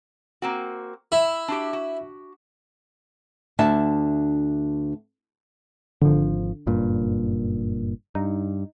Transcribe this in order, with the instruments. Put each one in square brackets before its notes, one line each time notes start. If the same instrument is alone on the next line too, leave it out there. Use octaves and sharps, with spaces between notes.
[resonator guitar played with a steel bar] A#3 C4 F#4
[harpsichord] E4 [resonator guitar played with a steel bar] E5
[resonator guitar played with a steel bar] D4 F#4 G4
F#4
[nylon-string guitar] D2 D4 E5 A5
[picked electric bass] G#1 F3 [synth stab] D3
[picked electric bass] F#1 G2 A#2
[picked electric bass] G2 [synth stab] D#4